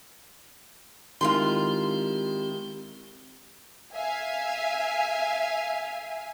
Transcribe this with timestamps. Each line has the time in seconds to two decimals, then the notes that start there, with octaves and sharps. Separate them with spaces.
1.21 D#3 G#3 C4 E4 F4 G4 G#4 C6
3.94 E5 F5 G#5